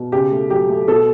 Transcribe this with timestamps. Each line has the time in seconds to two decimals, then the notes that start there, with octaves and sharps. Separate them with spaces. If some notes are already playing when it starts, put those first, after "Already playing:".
Already playing: B2
0.12 C#3 G4
0.32 A3
0.50 F#3 G4
0.69 A3
0.88 B2 A4